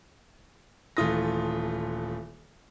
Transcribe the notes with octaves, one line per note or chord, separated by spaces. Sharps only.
D#1 E3 A3 F4 D#6 A#6